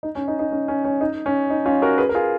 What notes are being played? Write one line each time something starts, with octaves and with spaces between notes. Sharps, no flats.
D#4
C#4
D#4
D#4
C#4
C#4
C#4
D#4
C#4
D#4
C#4 F4
F#4 A#4
G#4 B4
A#4
F4 G#4